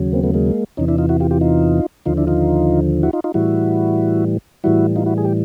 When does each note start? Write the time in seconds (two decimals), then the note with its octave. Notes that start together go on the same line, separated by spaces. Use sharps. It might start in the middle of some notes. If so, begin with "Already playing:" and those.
Already playing: D#2 C#3 F#3
0.13 A#3 C4
0.23 A3 B3
0.34 G#3 A#3
0.77 E2 C3 E3 C#4 D#4
0.88 D4 E4
0.98 D#4 F4
1.09 E4 F#4
1.20 F4 G4
1.31 F4 G4
1.41 D#4 F4
2.06 D#2 D3 F3 D#4 F4
2.17 D4 E4
2.27 D#4 F4
3.03 E4 F#4
3.13 D#4 F4
3.24 D#4 F4
3.34 A2 E3 G3 E4 F#4
4.64 A2 E3 G3 E4 F#4
4.96 D#4 F4
5.06 E4 F#4
5.18 G#4
5.25 G4